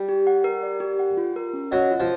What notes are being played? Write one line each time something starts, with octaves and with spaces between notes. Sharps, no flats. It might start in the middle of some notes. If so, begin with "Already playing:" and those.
Already playing: G3
G4
F#5
A#4
D5
G4
F#5
F4
A#4
C#4
F#3 D#5
F4
F3